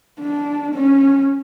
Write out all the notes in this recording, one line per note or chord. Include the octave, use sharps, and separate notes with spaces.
D4
C#4